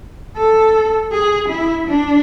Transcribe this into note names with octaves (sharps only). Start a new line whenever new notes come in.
A4
G#4
E4
D4